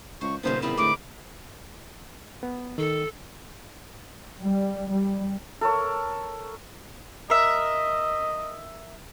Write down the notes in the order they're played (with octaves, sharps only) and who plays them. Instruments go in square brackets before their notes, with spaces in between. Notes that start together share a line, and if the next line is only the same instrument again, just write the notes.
[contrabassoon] C#2 [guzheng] C5 [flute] C#6
[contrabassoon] D#1 [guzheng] A#2 C#3 B3 [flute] C5
[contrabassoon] E2 [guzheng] G3 C4 D#4 [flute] B5
[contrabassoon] A2 [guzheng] D3 G#3 D#4 [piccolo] D6
[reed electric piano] B3
[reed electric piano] D#3 [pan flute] A4
[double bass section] G3
G3
[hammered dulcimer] A4 A#4 C#5
[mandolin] A#4 E5 [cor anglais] D#5